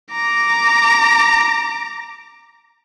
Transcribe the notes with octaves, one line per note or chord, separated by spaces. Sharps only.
A#5 D6